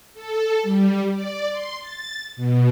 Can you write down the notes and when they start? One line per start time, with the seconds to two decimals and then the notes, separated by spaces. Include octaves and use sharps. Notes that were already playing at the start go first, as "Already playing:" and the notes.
0.14 A4
0.63 G3
1.12 D5
1.51 C6
1.81 A6
2.36 B2